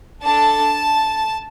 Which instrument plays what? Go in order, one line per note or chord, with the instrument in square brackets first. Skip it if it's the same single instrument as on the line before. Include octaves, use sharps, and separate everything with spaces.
[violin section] D4 A4 A5